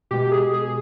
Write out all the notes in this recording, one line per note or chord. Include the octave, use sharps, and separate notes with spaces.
B2 G#3 G4
G#4
G#4